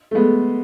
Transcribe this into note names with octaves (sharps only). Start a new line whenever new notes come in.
A3
G#3 B3